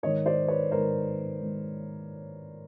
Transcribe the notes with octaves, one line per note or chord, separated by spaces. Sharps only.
G#2 D#3 C#5 D#5
C5 D5
B4 C#5
G#2 D#3 A#4 C5
G#2 D#3